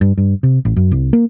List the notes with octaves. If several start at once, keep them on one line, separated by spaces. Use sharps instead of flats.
G2
G2
C3
A1
F#2
C2
A#3